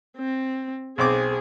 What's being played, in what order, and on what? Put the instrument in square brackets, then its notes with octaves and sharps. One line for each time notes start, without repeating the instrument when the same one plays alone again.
[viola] C4
[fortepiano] B1 C4 D6 [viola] G#4